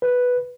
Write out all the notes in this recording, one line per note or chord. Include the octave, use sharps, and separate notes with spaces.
B4